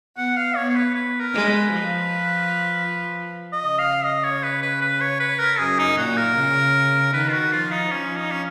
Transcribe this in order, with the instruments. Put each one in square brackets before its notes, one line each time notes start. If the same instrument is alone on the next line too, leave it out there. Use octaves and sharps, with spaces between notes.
[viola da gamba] B3 [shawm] F#5
[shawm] F5
[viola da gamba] B3 [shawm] C#5
[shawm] C#5
B4
B4
A#4
[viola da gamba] G#3
[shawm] B4
[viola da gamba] F3
[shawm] D#5
[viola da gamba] C#3
[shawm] F5
D#5
C#5
B4
B4
B4
C#5
B4
A#4
[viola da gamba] F#2 [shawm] G#4
[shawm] D#4
[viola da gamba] A#2 [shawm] F#4
[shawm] A#4
[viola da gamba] C#3
[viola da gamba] D#3 [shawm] B4
[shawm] F4
F#4
[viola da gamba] F3 [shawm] F4
[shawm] D#4
[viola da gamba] F3 [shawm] C#4
[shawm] D#4
C#4